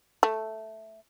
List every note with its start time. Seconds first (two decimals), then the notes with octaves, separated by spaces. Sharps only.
0.23 A3